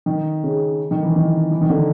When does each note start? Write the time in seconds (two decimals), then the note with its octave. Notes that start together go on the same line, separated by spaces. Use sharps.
0.06 D#3
0.43 C#3
0.91 D#3
1.03 E3
1.16 D#3
1.51 E3
1.61 D#3
1.70 D3